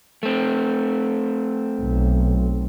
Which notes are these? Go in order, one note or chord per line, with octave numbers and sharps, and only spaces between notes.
A3 C4
B1